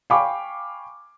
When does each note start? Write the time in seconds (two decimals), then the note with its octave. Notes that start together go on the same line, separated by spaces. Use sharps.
0.10 F5 G5 G#5 B5 C#6 D6